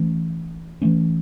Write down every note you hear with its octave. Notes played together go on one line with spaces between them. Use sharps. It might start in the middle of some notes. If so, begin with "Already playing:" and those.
Already playing: E3 A3 C#4
E3 A3 C#4